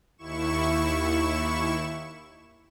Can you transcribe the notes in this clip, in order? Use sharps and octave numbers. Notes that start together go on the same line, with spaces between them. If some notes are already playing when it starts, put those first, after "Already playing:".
D#2 E4 C#6 E7